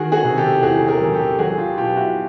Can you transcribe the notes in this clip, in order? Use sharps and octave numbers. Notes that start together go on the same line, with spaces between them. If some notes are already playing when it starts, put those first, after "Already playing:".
Already playing: D#3 F#4 G#4
F#4 G#4
C3
G4 A4
E2 F#4 G#4
G#4 A#4
F#3
G4 A4
F#3 F#4 G#4
F4 G4
B2 F4 G4
E4 F#4